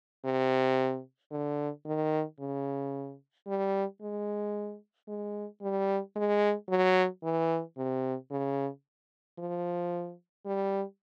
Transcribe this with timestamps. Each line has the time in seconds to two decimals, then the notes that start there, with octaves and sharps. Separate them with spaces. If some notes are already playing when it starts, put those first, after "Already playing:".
0.25 C3
1.32 D3
1.86 D#3
2.40 C#3
3.47 G3
4.01 G#3
5.08 G#3
5.62 G3
6.16 G#3
6.69 F#3
7.23 E3
7.77 C3
8.31 C#3
9.38 F3
10.45 G3